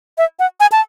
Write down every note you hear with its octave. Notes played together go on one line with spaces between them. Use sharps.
E5
F#5
G#5
A5